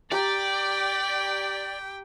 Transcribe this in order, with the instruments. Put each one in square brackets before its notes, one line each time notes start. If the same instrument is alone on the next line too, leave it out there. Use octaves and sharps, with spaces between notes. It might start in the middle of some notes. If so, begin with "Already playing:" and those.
[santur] G4 A#5 [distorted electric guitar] D5 [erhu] G5 [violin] D6 B6